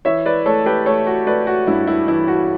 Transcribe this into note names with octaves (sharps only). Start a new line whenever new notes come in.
E3 C#5 E5
B4 D5
A3 A4 C#5
G4 B4
A3 A4 C#5
F#4
A3 B4 D5
F#4
G2 E4
E4
E3 E4
F#4